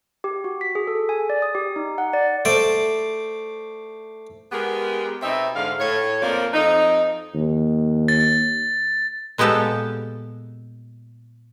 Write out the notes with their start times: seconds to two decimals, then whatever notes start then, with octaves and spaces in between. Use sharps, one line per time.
0.24 G4
0.44 F#4
0.61 B6
0.75 G#4
0.87 A4
1.09 G#5
1.30 D5
1.42 D#6
1.55 G4
1.76 D#4
1.98 F#5
2.13 D5
2.45 A3 C5 D5
4.52 G#3 B3 G4 A#4
5.23 B2 C4 D#4 E5
5.56 G#2 D3 F5
5.79 A2 C#5
6.22 F2 F3 A#3 A#4 D5
6.54 F2 D#4
7.35 D#2
8.08 A6
9.38 A#2 G#3 B3 G4 A4 A5